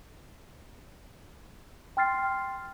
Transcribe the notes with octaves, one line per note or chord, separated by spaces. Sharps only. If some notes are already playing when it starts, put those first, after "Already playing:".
G5 C6 F6 A6 C7